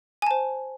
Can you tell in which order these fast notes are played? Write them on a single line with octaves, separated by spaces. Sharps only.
G#5 A5 C5